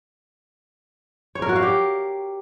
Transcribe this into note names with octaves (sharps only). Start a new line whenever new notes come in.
C#5
A#4
F#4
F5
G4